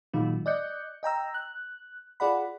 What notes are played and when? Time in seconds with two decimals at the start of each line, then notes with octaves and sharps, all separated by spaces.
0.13 A#2 D#3 F#3 G#3 D#4 F4
0.46 D5 D#5 F#6 G6 C#7
1.03 D#5 G5 A#5 E6
1.34 F#6
2.20 F4 G#4 D5 F#5 B5